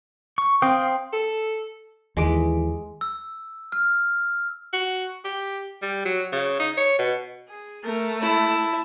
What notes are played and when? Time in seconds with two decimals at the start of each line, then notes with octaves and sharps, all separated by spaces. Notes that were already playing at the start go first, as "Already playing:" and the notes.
0.38 C#6
0.62 C4 F5 G5 D#6
1.13 A4
2.17 D#2 E3 G#3 B5 D6
3.01 E6
3.72 F6
4.73 F#4
5.25 G4
5.82 G3
6.05 F#3
6.32 C#3
6.60 D#4
6.77 C#5
6.99 B2
7.49 G#4
7.84 A3 A#4
8.21 E4 A5